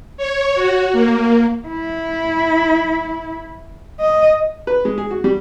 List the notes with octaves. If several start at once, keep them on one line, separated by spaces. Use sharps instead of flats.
C#5
F#4
A#3
E4
D#5
B4
G#3
G#4
F#4
G3